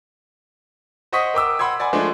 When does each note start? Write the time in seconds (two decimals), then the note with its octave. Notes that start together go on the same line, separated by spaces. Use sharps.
1.13 C5 D#5 F#5 C#6 D#6 B6
1.34 A#4 G5 D6 E6
1.59 F#5 B5 C6 E6 G#6
1.80 D5 F#5 G#5 B5
1.93 F3 G#3 A3 D4